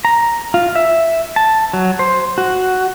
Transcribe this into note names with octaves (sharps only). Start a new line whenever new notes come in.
A#5
F4
E5
A5
F#3
C5
F#4